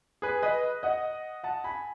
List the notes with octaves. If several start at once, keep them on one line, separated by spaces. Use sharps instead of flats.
G#4 B4
B4 D#5
D#5 F#5
F#5 A5
G#5 B5